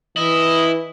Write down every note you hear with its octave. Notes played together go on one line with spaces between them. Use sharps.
E3 E4 D#5